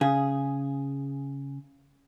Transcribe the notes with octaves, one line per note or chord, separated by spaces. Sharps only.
C#3 G#4